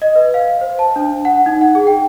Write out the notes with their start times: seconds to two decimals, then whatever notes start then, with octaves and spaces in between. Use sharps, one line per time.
0.02 D#5
0.16 B4
0.34 F5
0.61 C5
0.79 A5
0.96 D4
1.25 F#5
1.46 D#4
1.61 F#5
1.75 G#4
1.87 G5